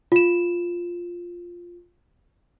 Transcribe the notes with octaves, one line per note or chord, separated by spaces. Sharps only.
F4 E7